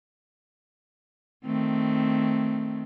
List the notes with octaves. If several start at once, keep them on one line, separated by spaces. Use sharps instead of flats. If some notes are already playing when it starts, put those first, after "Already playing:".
D#3 A3 C4